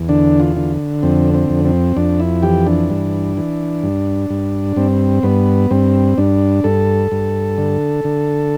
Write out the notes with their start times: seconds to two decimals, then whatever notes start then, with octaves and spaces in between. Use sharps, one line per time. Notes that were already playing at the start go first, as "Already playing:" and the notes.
Already playing: E2
0.09 D3 D4
0.40 F4
0.56 D3
1.03 F2 C4
1.34 C4
1.50 F2
1.65 C4
1.97 F2 D4
2.20 E4
2.43 E3 G4
2.66 D4
2.90 G2
3.37 E3
3.83 G2
4.30 G2
4.76 G2 C4
5.23 G2 B3
5.71 G2 C4
6.18 G2 D4
6.64 G2 A4
7.12 G2
7.58 D3
8.05 D3